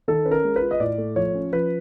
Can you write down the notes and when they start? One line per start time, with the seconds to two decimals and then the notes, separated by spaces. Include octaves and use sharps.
0.08 D#3 A4
0.25 C#4 B4
0.31 A#4
0.44 G#3
0.56 B4
0.61 F4
0.71 D#5
0.80 A2 D5
0.98 A3
1.16 F3 C#5
1.35 C#4
1.52 F3 B4